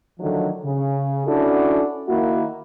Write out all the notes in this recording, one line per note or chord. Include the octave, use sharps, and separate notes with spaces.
D3 D#3 F3 F#3 A3
C#3
C#4 D4 E4 F#4 A4
D#3 A#3 E4 F#4